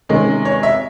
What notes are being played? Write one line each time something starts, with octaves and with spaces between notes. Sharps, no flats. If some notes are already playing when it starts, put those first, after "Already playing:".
C3 D#3 G#3 C#4
C#5
E5